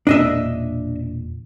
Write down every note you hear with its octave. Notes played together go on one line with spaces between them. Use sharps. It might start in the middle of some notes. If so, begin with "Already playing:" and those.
E1 A#2 D4 D#5 E5